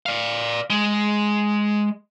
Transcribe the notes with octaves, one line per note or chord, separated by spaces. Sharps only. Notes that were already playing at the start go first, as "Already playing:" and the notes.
D5 F5
G#3